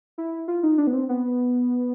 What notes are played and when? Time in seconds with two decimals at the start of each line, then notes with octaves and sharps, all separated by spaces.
0.18 E4
0.48 F4
0.63 D#4
0.78 D4
0.87 B3
0.93 C4
1.09 B3